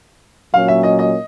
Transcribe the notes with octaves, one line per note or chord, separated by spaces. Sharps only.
A#2 F#3 A#3 C#4 F5
E5
D#5
D#5